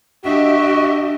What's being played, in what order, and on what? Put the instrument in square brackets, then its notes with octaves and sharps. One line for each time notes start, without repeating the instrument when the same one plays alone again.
[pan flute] D4 [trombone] F#4 [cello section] G4 D#5 E5